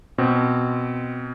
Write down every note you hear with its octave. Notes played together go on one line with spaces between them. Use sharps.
B2 C4